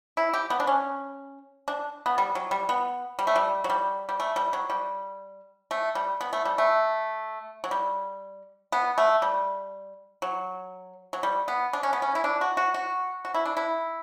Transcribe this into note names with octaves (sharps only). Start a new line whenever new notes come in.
E4
G4
B3
D4
C#4
D4
B3
G3
F#3
G3
B3
G3
A3
G3
F#3
G3
G3
A3
G3
F#3
G3
A3
G3
B3
A3
G3
A3
F#3
G3
B3
A3
G3
F#3
F#3
G3
B3
D4
C#4
B3
C#4
E4
D4
F#4
F#4
F#4
F#4
E4
D4
E4